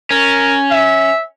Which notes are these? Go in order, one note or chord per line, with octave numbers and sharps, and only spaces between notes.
C#4 A#4
E5